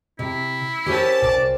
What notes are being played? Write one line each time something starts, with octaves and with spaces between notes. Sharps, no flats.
C3 E4
C#4 G4 A#4 C5 A5
C2 D5